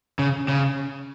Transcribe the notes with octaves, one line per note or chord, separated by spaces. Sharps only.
C#3
C#3